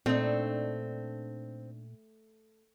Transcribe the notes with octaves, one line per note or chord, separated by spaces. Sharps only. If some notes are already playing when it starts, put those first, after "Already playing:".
A#2 A3 C4 D4 D#4